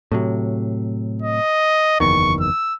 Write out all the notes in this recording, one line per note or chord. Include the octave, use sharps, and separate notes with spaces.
A2 C3 F#3
D#5
F#1 E2 D#3 C#6
E6